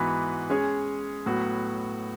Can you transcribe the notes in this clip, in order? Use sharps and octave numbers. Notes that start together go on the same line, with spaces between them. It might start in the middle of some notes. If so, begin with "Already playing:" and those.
Already playing: G#2 E3 B3 F#4 B4
G#3 C#4 G#4 C#5
A2 F#3 B3 F#4